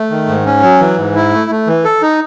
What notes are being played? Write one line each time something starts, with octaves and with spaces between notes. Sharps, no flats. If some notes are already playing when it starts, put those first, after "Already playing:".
Already playing: A3
D#3
G#2
C#4
F#3
E3
G#2
E4
A3
A3
E3
A4
D#4